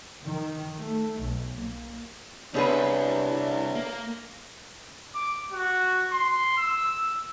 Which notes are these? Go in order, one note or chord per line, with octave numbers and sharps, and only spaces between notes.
D#3
A3
B1
A#3
C2 B3 D4 G#4 B4 C#5
A#3
D6
F#4
C6
E6